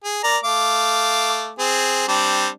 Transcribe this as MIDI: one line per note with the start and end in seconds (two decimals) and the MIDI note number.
0.04 0.21 68
0.24 0.38 70
0.24 0.38 74
0.24 0.38 82
0.44 1.52 57
0.44 1.52 77
0.44 1.52 86
1.59 2.07 60
1.59 2.07 68
2.08 2.48 55
2.08 2.48 60
2.08 2.48 62